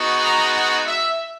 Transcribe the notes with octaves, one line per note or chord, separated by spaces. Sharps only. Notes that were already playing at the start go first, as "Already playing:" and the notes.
Already playing: G#3 B3 D#4 F#4
A#5
F#5
E5